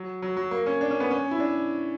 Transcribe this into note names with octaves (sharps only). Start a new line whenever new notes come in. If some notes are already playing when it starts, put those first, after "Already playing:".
Already playing: F#3
F#3
F#3
A#3
C#4
D4
C#4
B3
C#4
E4
D4